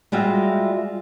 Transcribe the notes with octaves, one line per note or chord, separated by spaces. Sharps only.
G3 G#3 F4 F#4 E5